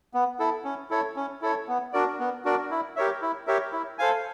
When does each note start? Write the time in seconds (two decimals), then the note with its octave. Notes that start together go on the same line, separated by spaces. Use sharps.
0.14 B3
0.40 E4 A4
0.65 C#4
0.90 E4 A4 C#5
1.16 C#4
1.42 E4 A4 C#5
1.68 B3
1.93 D4 F#4 A#4 D5
2.19 B3
2.45 D4 F#4 A#4 D5
2.71 E4
2.96 G4 A#4 C#5 E5
3.22 E4
3.47 G4 A#4 C#5 E5
3.72 E4
3.99 A4 C5 F5 G#5